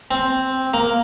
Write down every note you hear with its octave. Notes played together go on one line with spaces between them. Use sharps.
C4
A#3